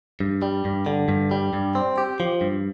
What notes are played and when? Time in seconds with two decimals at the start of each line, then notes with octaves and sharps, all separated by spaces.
0.20 G2
0.42 G3
0.65 G2
0.86 D3
1.08 G2
1.31 G3
1.53 G2
1.75 C4
1.98 G4
2.20 F3
2.41 G2